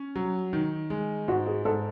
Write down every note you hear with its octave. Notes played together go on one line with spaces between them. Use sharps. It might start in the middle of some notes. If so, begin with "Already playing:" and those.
Already playing: C#4
F#3
D#3
G#3
G#2 F#4
G#4
G#2 A4